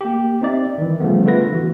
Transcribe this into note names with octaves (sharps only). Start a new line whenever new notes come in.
A#3 G4
C4 D#4 D5 E5
D#3 E3
C#3 F3 G3 A3 B3
D3 A3 B3 F4 B4 A#6
E3 F#4